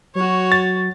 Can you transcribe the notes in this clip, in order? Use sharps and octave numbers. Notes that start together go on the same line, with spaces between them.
F#3 F#4 C#5
A6